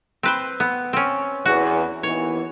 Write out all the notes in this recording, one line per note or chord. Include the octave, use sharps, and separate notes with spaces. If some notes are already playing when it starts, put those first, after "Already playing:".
C4 B4 C5
B3
C4 C#4
E2 F#4
D#2 E3 B3 C#5